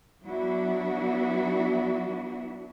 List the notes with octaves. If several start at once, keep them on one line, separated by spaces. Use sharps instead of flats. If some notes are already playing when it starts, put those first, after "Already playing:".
F#3 B3 D4 E4 F#4